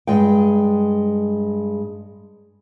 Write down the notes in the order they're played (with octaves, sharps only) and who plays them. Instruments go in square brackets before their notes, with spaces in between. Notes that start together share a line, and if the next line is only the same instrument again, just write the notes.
[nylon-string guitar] G2 G#3 G5